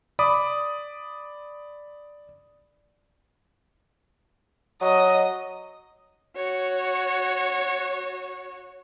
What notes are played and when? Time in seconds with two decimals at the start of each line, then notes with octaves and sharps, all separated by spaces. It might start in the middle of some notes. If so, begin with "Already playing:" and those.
0.19 D5 B5 D6 D#6
4.81 F#3 D#5
6.36 F#4 C#5